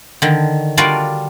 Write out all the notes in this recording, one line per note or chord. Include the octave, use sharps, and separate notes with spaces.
D3 D#3
G3 D4 F4 F#4 A#4 D5